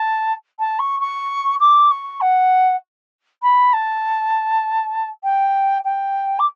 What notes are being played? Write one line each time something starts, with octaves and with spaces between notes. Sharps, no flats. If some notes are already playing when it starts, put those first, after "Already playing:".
Already playing: A5
A5
C#6
C#6
D6
C#6
F#5
B5
A5
G5
G5
D6